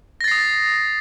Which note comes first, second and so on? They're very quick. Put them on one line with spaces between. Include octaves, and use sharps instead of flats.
A#6 A6 C7 D#6